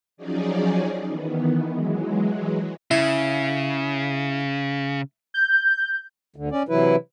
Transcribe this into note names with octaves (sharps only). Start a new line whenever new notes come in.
F3 F#3 C#4 D#4 G#4 D5
D#3 E3 B3
E3 F#3 G#3
C#3 E4
G6
D2 D3
C#4 D5
C3 E3 F#3 E4 B4